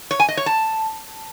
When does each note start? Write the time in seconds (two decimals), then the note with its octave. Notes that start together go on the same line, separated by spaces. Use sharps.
0.11 C#5
0.20 G#5
0.28 D#5
0.37 C#5
0.46 A5